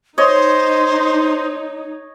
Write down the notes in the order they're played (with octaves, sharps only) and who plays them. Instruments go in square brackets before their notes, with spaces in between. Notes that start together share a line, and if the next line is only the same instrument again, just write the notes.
[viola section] D#4 [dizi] C5 [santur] C#5 D#5